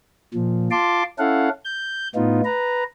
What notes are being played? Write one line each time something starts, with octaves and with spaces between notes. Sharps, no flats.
A#2 F3
F4 A5 C6 D6
C#4 E4 A4 F5 F#5
G6
A2 B3 D#4 F4
B4 A#5